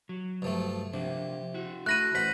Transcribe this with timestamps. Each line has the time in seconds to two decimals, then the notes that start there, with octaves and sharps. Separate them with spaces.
0.09 F#3
0.42 G2 F3 A3
0.94 C3 F3 D4
1.54 E4 F#4
1.86 A3 B5 F#6 A#6 D#7
2.15 A1 C5 F#5 B6